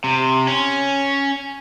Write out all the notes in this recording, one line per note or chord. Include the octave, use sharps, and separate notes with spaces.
C3
C#4